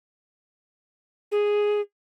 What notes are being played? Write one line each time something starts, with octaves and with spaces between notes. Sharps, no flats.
G#4